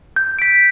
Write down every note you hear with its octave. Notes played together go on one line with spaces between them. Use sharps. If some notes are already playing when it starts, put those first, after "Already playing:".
G6
B6 D7